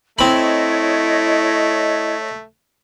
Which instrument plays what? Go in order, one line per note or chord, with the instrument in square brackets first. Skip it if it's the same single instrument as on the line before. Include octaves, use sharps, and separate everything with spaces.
[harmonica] A3 [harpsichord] C4 B5 [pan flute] E4 [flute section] C#5 D#5